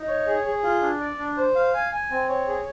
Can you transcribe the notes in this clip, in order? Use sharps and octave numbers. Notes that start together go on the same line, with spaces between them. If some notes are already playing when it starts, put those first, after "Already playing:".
Already playing: D#4
C#5
G#4
G#4
F4
D4
D5
D4
C5
F5
G#5
G#5
C4
C#5
G#4